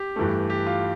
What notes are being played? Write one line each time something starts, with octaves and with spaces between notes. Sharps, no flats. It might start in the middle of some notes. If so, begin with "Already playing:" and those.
Already playing: G4
G2 E3 A3
G4
F4